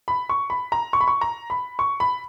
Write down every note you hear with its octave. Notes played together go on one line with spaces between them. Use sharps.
B5
C#6
B5
A#5
C#6
B5
C#6
A#5
B5
C#6
B5